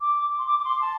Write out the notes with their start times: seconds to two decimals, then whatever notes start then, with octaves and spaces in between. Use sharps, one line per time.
0.01 D6
0.38 C6
0.46 D6
0.59 D6
0.65 C6
0.81 A5